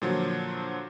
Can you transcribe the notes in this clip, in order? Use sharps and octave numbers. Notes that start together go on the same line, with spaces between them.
A#2 D3 F3 F#3